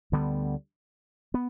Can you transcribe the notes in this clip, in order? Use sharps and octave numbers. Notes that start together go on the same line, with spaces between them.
D2 D3 G3 B3
B3